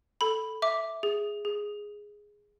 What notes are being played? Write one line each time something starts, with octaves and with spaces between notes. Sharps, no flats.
A4 B5
E5 D6
G#4
G#4